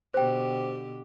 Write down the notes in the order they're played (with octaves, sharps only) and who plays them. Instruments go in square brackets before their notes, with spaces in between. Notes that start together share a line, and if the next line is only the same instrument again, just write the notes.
[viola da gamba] B2 D3 G4 [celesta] C5 G5